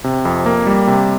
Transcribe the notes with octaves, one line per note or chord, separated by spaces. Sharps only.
C3
F2
A#3
G3
C3